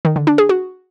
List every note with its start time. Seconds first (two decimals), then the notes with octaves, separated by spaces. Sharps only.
0.05 D#3
0.16 D3
0.27 D4
0.38 G#4
0.49 F#4